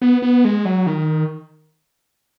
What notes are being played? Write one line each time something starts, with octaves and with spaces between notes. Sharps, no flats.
B3
B3
G#3
F#3
D#3